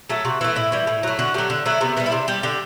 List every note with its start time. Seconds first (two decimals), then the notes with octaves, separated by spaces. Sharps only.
0.10 F#3 A3 A4
0.25 C3 F#4
0.41 E3 A3 E4
0.56 A2 E4
0.72 E3 G3
0.87 A2
1.03 F#3 A3
1.19 D3 F#4
1.34 F#3 A3 G4
1.50 D3
1.66 F#3 A3 E4
1.81 C3 B3
1.97 E3 G3 B3
2.06 E4
2.12 C3 D4
2.28 G3 G4
2.43 D3 G4